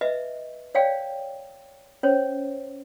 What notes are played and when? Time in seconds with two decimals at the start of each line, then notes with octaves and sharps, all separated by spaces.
0.01 B4 D#5 E5
0.75 C#5 D5 F5 G5
2.03 C#4 C5 C#5